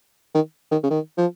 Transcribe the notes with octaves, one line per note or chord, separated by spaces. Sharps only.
D#3
D#3
C#3
D#3
F3